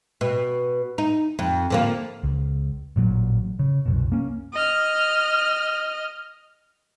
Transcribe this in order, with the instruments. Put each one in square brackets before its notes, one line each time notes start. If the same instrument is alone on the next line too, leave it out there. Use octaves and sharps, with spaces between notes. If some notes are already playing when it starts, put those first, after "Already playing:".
[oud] B2
D#4
F2
D3 F3 A#3
[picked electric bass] C#2
A1 A#2 F#3
C#3
C2 F#2 B2
A#3 C#4
[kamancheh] D#5 F6